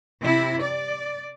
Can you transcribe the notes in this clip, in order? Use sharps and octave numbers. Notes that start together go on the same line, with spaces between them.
C3 E4
D5